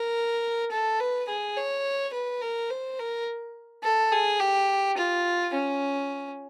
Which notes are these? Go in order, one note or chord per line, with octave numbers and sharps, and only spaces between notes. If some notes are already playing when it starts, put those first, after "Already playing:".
Already playing: A#4
A4
B4
G#4
C#5
B4
A#4
C5
A#4
A4
G#4
G4
F4
C#4